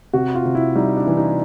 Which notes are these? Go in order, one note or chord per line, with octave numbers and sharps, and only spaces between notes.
C3 F#4
F4
C3
E4
G3 D#4
D4
E3
D#4